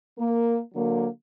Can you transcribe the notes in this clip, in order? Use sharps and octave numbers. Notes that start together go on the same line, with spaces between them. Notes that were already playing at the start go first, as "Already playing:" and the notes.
A#3
D3 F#3 A#3